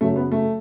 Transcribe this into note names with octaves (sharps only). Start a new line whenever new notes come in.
F#2 C#3 F#3 A3
B3
A3